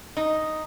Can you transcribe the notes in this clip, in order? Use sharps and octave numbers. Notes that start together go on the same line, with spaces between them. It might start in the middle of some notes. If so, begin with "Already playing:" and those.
D#4